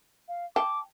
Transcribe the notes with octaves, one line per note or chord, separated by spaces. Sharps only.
F5
G5 A5 D6